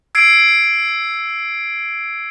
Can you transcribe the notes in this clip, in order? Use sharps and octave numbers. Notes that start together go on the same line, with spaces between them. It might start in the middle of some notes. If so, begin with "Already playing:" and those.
E6 G#6 C7 D7